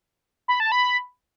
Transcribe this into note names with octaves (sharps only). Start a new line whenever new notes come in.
B5
A5
B5